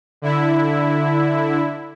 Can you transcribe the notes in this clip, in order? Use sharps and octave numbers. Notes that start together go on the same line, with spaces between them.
D3 E4